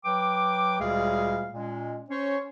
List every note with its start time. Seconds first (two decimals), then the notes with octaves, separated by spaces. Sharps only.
0.05 F#3 B4 G5 D6
0.79 D2 A#2 G3 G#3 G#4 F5
1.54 A#2 G#3 C#4
2.10 C#4 C5 C#5